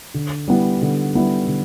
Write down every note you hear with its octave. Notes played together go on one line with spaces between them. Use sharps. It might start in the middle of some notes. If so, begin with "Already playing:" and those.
D3
G3 B3 E4
D3
G3 B3 E4
D3